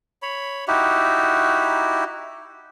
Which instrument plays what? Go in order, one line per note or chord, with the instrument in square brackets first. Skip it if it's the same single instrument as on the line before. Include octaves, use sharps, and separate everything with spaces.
[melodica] C#5 B5
D#4 E4 F#4 G4